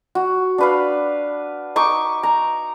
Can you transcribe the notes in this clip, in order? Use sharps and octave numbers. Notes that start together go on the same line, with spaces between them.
F#4
D4 B4 F5
D#4 C#6 D6
A#5